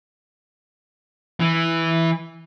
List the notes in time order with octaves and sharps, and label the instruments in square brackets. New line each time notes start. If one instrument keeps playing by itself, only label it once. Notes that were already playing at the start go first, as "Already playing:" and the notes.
[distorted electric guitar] E3